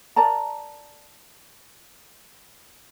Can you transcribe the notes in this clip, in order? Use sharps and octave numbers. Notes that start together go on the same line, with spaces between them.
A#4 D5 A5 A#5